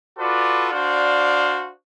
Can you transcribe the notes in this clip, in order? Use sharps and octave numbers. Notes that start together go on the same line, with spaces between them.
F4 F#4 A4 B4 D5
D4 F#4 C5 D5 F5